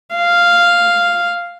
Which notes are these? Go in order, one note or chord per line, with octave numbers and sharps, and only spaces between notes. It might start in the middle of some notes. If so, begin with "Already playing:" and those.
F5